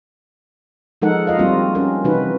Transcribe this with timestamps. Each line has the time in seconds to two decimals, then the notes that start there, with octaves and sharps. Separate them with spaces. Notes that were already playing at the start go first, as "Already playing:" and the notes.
1.02 F3 G#3 D#4 A4 A#4 F#5
1.27 F4 D#5 F5
1.39 G3 A#3 C4 D4 F4 F#4
1.75 C#4 A#4
2.04 C3 E3 D#4 F#4 B4